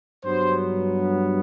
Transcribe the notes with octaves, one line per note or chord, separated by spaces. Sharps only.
G2 F#3 B3 C5